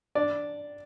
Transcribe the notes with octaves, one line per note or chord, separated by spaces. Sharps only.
D4 D5